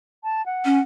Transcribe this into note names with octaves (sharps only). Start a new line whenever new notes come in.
A5
F#5
C#4